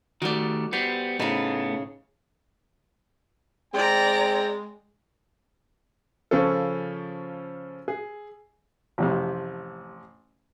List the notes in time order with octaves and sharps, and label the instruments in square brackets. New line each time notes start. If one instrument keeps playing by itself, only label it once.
[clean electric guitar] D#3 G3 A3 [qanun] F#4 D5
[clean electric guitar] G3 B3 [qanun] C5
[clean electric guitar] A2 A3 B3 [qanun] C#3 D#4
[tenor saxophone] G#3 [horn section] C4 G5 [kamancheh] D5 A#5
[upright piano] C#3 F3 C#4 F4 A4
G#4
[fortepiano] A1 F2 C3